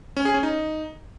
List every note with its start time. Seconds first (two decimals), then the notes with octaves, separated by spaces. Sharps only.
0.17 C#4
0.25 G#4
0.34 C#4
0.43 D#4